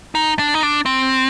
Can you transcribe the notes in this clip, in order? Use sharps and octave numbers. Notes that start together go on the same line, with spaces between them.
D#4
D4
D#4
D4
C4